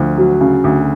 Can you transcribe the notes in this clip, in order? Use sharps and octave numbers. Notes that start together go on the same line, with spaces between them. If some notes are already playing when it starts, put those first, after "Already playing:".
Already playing: D2 F3
F#3
C#3
D2